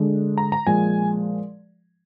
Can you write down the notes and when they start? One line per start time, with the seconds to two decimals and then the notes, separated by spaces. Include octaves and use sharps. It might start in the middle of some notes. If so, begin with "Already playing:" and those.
Already playing: D3 G#3 D4
0.38 A#5
0.52 A#5
0.67 A#2 F3 G#3 G#5